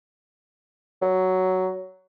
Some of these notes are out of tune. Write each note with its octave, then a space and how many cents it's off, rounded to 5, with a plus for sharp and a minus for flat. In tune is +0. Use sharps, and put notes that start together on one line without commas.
F#3 +10